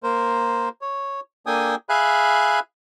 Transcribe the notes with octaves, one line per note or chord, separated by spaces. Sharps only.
A#3 A#4 C5
C#5
A#3 D4 A4 G5 G#5 D#6
G#4 E5 F5 G#5 B5 F#6